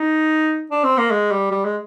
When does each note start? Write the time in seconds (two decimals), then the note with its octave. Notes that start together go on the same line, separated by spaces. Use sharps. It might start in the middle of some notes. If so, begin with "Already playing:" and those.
Already playing: D#4
0.71 D4
0.84 C4
0.98 A#3
1.11 G#3
1.31 G3
1.51 G3
1.65 G#3